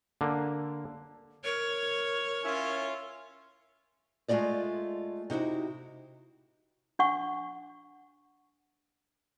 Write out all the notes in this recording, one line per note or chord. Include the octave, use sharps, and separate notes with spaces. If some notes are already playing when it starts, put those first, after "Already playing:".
D3 A#3
A#4 C#5
C#4 E4 F4
G#3 A3 B3 F4 D5 D#5
C3 D#4 E4 F#4
D4 F#5 C#6